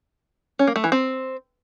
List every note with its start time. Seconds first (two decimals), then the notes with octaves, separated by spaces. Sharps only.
0.59 C#4
0.67 A#3
0.76 A3
0.84 E3
0.92 C4